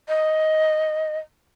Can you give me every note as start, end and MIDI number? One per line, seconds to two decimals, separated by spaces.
0.08 1.17 75